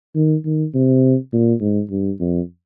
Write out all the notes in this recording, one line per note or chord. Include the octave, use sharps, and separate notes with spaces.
D#3
D#3
C3
A#2
G#2
G2
F2